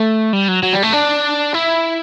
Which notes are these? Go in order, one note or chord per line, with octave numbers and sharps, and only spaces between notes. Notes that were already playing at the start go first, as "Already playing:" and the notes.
Already playing: A3
G3
F#3
F#3
G3
A3
D4
E4